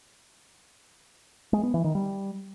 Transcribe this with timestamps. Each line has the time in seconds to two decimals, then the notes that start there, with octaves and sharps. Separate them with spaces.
1.53 G#3
1.63 B3
1.74 E3
1.84 D#3
1.95 G3